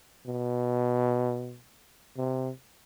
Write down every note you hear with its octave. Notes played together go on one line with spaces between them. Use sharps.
B2
C3